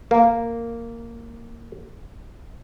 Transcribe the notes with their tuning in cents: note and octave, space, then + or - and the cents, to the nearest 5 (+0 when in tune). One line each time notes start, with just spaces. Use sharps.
A#3 -10